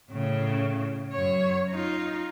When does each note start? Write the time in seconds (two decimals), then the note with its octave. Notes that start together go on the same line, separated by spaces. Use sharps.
0.10 A2 C#3
1.12 F#2 C#5
1.69 D#4 F4